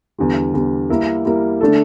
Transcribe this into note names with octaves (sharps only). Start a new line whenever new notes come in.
E2 D3 G3
E2 D3 G3
G3 A#3 E4 A#4
G3 A#3 E4 A#4
D3 A3 D4 A4